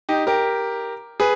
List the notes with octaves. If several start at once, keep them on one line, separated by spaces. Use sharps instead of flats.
D#4 G4
G4 A#4
G#4 B4